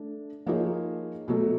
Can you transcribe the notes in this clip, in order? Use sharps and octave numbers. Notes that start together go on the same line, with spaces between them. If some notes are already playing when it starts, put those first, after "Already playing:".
Already playing: A3 D4
F3 A#3 D#4 G#4 C#5
B2 F#3 A3